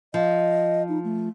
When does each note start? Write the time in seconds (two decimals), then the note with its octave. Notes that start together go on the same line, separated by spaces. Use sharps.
0.14 F3 D#5
0.89 D#4
1.04 A3